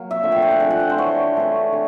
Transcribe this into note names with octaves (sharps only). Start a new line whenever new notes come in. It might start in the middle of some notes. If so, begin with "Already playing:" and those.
Already playing: F#3 A#3
E5
D3 F3 A3
G5
G5
F#5
D3 F3 A3 G#5
F#5
G5
C5
E3 A3 D4 C#5
E3 A3 D4
D3